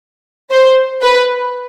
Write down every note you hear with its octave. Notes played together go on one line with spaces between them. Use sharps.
C5
B4